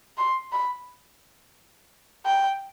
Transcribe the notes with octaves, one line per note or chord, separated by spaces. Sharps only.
C6
B5
G5